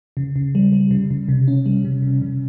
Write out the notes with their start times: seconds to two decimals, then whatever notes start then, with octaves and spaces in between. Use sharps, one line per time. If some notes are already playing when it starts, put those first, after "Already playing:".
0.17 C#3
0.36 C#3
0.55 G3
0.73 G3
0.91 C#3
1.11 C#3
1.28 C3
1.48 C#4
1.66 G3
1.85 C3
2.02 C3
2.22 C3